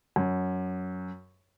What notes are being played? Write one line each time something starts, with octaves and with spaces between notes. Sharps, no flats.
F#2